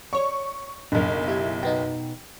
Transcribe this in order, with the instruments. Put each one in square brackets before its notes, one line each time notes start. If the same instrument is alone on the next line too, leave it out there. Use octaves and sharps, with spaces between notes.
[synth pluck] C#5 D5 [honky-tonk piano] C#6
[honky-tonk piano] F#1 B1 [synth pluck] D4 A#4
[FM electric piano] E4 [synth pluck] G4 E5 G#6
[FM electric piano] B2 B3 D#4 [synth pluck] G5